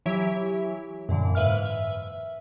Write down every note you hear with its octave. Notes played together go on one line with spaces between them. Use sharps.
E3 F#3 E4 G4 C#5 E5
F#2 A#2 D3 E3
G#2 B4 E5 F5 F6
E5